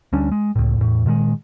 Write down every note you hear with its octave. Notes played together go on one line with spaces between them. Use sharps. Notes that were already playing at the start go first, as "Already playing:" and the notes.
D2 G3 C#4 D4
G#3
C#2 A2
E2 A2
A#2 D#3 E3 G#3